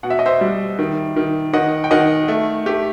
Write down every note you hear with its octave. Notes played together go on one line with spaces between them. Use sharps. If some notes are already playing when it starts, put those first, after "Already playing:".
B2 F#5
E5
D#5
C5 E5
G3
D#3
D#3
D#3 D#5 F#5
G5
D#3 D#5 F#5
A3
A3 G4